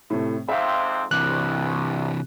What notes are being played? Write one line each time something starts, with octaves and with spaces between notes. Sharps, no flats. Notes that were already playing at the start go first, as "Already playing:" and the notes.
A2 C3 A3
F2 G#2 C4 E5 F5
C2 C3 E3 D6 F#6